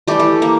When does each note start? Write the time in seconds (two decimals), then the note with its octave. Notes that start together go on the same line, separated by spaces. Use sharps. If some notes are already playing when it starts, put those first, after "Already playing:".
0.07 E3 G3 A3 G4
0.19 A3 A4
0.42 A#3 A#4